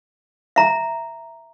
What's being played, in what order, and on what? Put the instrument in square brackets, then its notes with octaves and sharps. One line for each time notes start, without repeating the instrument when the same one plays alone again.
[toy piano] E5 A#5